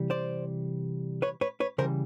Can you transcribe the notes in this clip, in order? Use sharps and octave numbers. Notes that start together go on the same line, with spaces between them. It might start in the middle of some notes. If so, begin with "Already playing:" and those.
Already playing: C3 E3 G3
C5 D5
B4 C#5
B4 C#5
B4 C#5
C#3 E3 G3 A#4 C5